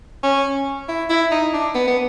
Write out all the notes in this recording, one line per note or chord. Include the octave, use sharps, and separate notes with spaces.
C#4
E4
E4
D#4
D4
B3
B3